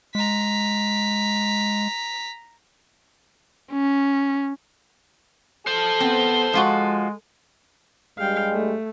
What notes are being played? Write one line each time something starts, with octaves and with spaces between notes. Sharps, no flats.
G#3 A#5 B6
C#4
A4 C5 A5
B3 C4
F3 G#3 F4 F#4
G2 G3 G#3 F5 G5
A3